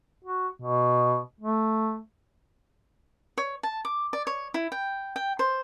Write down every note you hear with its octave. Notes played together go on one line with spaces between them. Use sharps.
F#4
B2
A3
C#5
A5
D6
D5
C#5
E4
G5
G5
C5